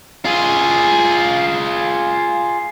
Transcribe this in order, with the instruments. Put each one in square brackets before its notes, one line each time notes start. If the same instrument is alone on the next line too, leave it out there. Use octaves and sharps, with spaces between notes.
[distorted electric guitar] F4 G#4